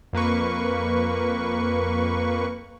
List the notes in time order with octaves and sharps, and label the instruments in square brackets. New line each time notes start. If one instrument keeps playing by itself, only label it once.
[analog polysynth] F2 A#3 B4 C#6